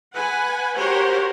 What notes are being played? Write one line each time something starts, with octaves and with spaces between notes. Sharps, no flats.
B4 F#5 G#5
F#4 G4 A#4 C5 C#5 F#5